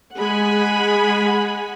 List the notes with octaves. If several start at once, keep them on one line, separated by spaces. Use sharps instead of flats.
G#3 F#5 G#5 B5